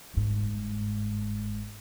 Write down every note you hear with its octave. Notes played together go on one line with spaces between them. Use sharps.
G1 G#2